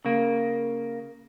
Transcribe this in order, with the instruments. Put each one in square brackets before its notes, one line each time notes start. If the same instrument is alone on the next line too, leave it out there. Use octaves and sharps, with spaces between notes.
[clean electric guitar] C#3 A#3